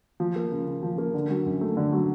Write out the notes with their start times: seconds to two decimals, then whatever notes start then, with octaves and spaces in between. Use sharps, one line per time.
0.20 F3
0.36 A#3
0.51 C#3
0.67 C#3
0.83 F3
0.98 A#3
1.14 D3
1.30 F#3
1.46 F#2
1.61 A3
1.77 D3
1.92 F#3